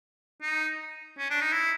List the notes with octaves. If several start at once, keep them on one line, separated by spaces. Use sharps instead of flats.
D#4
C#4
D4
D#4
E4